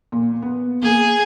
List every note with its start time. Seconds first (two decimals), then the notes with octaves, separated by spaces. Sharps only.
0.12 A#2
0.42 B3
0.82 A#3 G#4